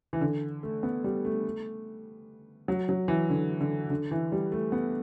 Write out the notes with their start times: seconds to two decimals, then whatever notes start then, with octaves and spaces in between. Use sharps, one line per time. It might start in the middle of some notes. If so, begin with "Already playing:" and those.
0.13 E3
0.21 D3
0.63 A3
0.83 B3
1.04 G3
1.25 A3
2.68 F#3
2.89 F#3
3.08 E3
3.30 D3
3.61 D3
3.90 D3
4.11 E3
4.32 G3
4.52 A3
4.72 B3